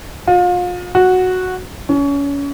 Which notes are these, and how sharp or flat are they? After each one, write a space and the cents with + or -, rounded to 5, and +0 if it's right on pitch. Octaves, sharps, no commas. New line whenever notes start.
F4 +35
F#4 -5
C#4 +30